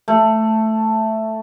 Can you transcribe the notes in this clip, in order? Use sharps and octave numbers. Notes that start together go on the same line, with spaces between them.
A3